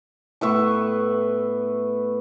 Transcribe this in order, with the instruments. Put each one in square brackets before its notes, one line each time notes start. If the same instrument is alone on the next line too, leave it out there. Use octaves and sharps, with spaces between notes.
[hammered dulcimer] A2 B3 E5 C#6